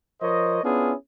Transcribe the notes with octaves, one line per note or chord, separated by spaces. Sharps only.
F3 A#4 C5 C#5 D#5
B3 C#4 D4 E4 F4 G#4